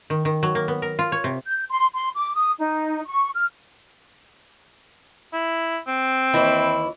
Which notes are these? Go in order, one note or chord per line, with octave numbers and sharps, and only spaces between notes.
D#3
D#3
F#3
A#3
B3
A#4
F4
C#5
C3
G6
C6
C6
D6
D#6
D#4
C#6
F6
E4
C4
D#2 E3 E4